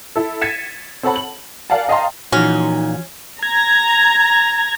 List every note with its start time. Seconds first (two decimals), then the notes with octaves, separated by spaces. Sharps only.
0.16 E4 A4
0.41 G#6 A6 B6 C#7 D#7 E7
1.03 C4 A4 C#5 F#5 A5 B5
1.16 F#7
1.70 A#4 D5 F5 F#5 G#5 A5
1.89 D#5 F5 G5 A5 A#5 C6
2.32 A#2 E3 F3 C#4 D#4 F#4
3.43 A#5 G#6